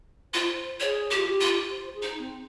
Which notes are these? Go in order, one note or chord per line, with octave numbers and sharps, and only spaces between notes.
F4 C5
G#4 C#5
G4
F4
G4
F4
C5
G#4
D#4
C4